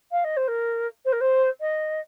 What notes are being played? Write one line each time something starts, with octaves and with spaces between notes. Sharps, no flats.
F5
D#5
C5
A#4
C5
A#4
C5
D#5